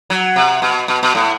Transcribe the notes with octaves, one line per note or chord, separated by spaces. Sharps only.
F#3
C3
B2
B2
B2
A2